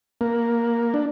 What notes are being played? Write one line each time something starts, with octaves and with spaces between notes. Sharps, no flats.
A#3
D4